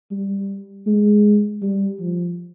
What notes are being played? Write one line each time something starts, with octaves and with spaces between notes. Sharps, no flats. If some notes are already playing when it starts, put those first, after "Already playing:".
G3
G#3
G3
F3